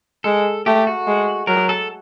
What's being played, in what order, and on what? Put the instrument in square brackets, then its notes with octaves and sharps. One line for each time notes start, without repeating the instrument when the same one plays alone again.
[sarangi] G#3 [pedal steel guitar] A4
[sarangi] A3 [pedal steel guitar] G4
[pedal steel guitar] F#4
[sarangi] G#3
[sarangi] F#3 [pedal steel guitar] A#4
[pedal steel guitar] A4